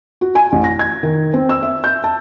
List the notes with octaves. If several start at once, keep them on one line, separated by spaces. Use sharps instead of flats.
F#4
G#5
A1
A#6
G#6
D#3
C4
E6
E5
G6
A5